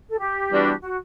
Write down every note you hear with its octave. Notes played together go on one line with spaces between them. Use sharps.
A4
G4
E3 G3 B3 D4 F#4
F#4